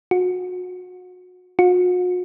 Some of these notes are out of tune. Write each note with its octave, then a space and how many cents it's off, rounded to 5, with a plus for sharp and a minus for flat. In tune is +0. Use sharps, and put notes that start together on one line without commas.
F#4 -30
F#4 -45